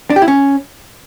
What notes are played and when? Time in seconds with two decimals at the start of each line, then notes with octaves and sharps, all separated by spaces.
0.10 D4
0.16 G4
0.22 E4
0.28 C#4